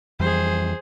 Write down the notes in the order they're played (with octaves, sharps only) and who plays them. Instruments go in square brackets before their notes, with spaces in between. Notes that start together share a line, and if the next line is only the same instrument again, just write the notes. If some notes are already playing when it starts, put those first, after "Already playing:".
[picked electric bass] F2 E3 G3 [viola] G#4 C5